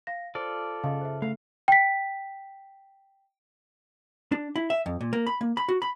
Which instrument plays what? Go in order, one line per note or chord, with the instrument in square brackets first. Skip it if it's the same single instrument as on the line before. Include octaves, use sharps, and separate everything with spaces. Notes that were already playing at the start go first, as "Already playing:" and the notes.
[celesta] F5 A#6
[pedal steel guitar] F4 A4 D5 [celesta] C5
[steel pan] C#3 [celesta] D#5 F5
[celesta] C5 E5
[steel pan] A3 [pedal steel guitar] F5
[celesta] G5 B6
[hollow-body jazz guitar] D4
E4
E5
F2
A#2
A#3
B5
A#3
B5
F#4
B5